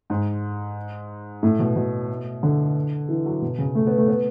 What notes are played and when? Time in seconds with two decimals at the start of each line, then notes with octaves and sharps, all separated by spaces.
0.10 G#2
1.43 A2
1.59 B2
1.76 B2
2.43 D3
3.09 E3
3.26 F#3
3.42 B2
3.58 C#3
3.75 A3
3.87 B3
3.98 A3
4.08 B3